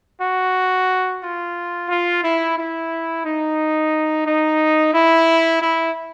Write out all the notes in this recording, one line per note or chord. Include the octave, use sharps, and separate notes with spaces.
F#4
F4
F4
E4
E4
D#4
D#4
E4
E4